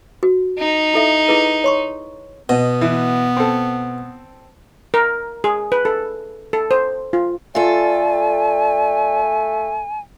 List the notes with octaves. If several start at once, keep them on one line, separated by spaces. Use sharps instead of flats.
F#4
D#4
E4 A4 E5
E4 G#4 B4
C#5 C6 C#6
B2 B3 D#5
E3
C4 A4
A#4
G#4
B4
A4
A4
C5
F4
A3 F4 A4 D5 G#5